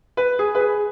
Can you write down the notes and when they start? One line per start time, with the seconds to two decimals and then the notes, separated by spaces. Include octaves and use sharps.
0.17 B4
0.39 G#4
0.55 B4
0.61 G#4